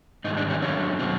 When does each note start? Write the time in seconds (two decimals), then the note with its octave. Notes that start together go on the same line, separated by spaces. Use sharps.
0.24 G#2 D#3 G3 D#4
0.37 D4
0.50 C#4
0.62 F2 D3 F#3 C#4
0.99 B2 F#3 C4